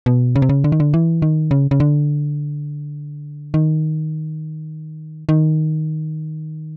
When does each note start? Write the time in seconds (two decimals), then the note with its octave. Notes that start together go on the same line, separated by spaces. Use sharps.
0.06 B2
0.36 C#3
0.42 C3
0.49 C#3
0.64 D3
0.72 D#3
0.80 D3
0.94 E3
1.22 D#3
1.51 C#3
1.71 C#3
1.80 D3
3.54 D#3
5.29 D#3